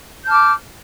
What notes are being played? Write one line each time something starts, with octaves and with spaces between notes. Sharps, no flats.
A5 D6 F6 G6